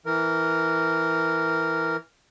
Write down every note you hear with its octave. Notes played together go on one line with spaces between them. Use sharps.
E3 A#4